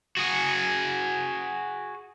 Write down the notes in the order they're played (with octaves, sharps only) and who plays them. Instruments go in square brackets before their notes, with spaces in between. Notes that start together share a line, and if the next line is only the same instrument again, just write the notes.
[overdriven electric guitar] F#4 G#4